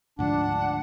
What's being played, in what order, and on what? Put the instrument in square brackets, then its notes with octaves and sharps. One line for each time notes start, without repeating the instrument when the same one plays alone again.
[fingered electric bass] D2 G#2 F3 [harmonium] D4 [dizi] F#5